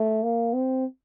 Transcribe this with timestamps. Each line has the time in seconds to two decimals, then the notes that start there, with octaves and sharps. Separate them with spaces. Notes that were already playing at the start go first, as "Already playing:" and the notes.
Already playing: A3
0.23 A#3
0.53 C4